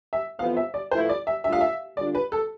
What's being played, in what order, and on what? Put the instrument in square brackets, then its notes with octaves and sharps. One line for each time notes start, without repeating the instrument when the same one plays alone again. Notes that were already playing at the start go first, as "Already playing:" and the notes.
[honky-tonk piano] E5
[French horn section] F2 E3 B3 F4 C5 [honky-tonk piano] F5
[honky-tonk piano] E5
D5
[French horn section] A2 F3 A3 E4 B4 [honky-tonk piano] C5
[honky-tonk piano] D5
E5
[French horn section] A2 G3 D4 F4 [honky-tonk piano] E5
[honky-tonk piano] F5
E5
[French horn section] D3 G3 D4 F4 [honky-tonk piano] D5
[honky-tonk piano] B4
A4